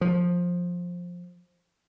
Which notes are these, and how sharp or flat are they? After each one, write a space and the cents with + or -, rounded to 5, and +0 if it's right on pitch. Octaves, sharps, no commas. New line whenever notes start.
F3 +15